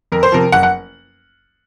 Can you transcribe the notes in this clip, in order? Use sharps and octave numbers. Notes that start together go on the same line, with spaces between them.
F2 A#4
C5
C3 F3 A#4
F#1 F#5
F#5